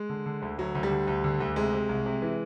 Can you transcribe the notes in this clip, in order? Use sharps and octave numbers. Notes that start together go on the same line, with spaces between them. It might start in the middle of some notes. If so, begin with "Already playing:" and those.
Already playing: G#3
D3
D3
D2
D2 F#3
D2
G3
D3
D2
D3
D2
C3 G#3
C3
C2
C3
E3